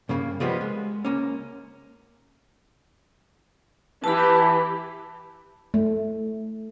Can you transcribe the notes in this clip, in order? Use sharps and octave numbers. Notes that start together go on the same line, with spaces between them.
G2 C#3 A#3
C#3 F3 G3 G#3 A#3 B3
G#3
C#2 A#3 C#4
E3 G4 A5 B5
A3